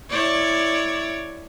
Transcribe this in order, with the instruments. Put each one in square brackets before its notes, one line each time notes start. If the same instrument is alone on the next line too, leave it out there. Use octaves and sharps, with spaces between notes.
[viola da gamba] E4 C#5 D5